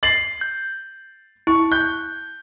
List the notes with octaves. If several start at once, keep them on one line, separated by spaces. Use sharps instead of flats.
A6 C7 F#7
G6
E4 C#6
F#6 G6